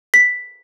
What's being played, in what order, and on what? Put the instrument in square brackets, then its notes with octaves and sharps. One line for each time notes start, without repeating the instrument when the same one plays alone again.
[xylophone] B6